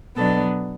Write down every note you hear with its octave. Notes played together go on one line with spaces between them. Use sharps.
B2 F#3 B3 D4 A4